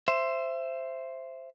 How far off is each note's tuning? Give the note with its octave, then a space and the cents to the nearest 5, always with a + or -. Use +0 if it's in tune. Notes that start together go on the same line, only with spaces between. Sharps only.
C5 +0 E5 +20